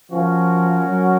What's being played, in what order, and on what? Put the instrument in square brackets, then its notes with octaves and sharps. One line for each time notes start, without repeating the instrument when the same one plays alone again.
[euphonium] F3 [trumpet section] C#4 F#4 A#4
[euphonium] F#3